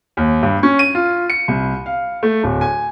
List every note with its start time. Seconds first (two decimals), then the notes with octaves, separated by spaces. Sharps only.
0.17 D#2
0.43 G2
0.63 C#4
0.79 D#7
0.95 F4
1.30 C#7
1.48 C2
1.86 F5
2.23 A3
2.43 D1
2.61 G#5